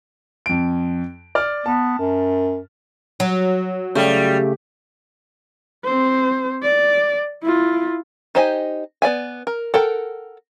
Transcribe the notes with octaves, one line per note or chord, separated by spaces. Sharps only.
F2 D7
D5 F6
B3 A5
F#2
F#3
C#3 G3 A3
C4 C5
D5
E4 F4
D#4 G4 C5 D#5 G#5
B3 D5 E5 G#5
A#4
A4 A#4 F#5 G5